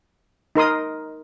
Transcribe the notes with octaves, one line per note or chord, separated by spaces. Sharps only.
D#4 A#4 C6 D#6